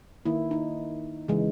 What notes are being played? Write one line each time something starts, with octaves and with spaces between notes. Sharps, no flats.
D#3 A#3 E4
D#4
C#3 E3 G#3